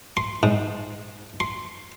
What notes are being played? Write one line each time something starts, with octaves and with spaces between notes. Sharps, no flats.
C6
G#2
C6